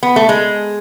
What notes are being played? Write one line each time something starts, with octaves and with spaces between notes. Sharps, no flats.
B3
A3
G#3